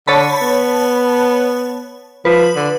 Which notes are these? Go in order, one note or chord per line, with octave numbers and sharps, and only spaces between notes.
D3 C#5 A5 B5
B3
F3 B4
D3